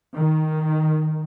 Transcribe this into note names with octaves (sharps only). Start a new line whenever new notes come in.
D#3